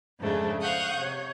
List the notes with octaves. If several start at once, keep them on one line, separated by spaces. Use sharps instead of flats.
F2 G#2 C#3 A3 D4
C5 F5 F#5 C#6 D#6 G6
C3 C#5